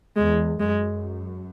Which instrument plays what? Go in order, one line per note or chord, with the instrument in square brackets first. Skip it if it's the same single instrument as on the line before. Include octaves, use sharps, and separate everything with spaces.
[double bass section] E2 [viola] G#3
[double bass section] F#2 [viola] G#3